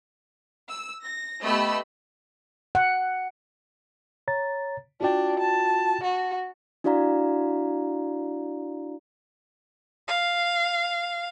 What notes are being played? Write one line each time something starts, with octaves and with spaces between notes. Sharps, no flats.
E6
A#6
A3 B3 G4 D#5 B5 E6
F#5
C#5 A#5 A6
D4 F4 F#4 G5
A5
F#4
D4 E4 F#4 D5 F5 A#5
F5